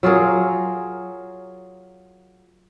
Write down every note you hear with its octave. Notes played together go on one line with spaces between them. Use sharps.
F#3 F4 G#4 A#4